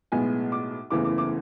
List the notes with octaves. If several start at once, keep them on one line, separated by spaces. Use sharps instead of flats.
B1 A2 G#3 B3 G#5
D6
F#1 E2 C#3 E3 A3 D6
D6
D6